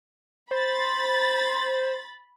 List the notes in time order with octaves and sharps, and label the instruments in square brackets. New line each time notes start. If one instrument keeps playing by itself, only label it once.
[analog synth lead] C5 [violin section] B5 A6